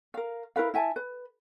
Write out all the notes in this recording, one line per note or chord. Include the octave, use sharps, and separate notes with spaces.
A#4 F5
E4 A#4 B4 F5
E4 E5 G#5 A5
B4